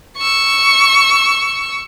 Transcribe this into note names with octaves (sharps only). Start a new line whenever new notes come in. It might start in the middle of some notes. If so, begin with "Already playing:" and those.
C#6 E6